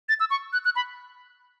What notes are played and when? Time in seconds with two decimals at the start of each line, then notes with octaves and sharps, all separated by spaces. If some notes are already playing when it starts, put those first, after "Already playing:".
0.09 A6
0.20 E6
0.30 C#6
0.53 F#6
0.65 F#6
0.76 B5